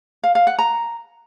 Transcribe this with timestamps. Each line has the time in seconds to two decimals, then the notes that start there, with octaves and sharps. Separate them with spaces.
0.23 F5
0.35 F5
0.47 F#5
0.59 A#5